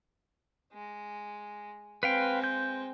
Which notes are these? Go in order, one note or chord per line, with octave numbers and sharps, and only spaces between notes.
G#3
G#3 C4 B4 F5 G5
G6